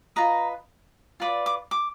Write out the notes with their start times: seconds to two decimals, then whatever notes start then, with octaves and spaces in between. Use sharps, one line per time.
0.16 F4 B4 D#5 A#5
1.20 F4 B4 D5
1.46 D6
1.71 D6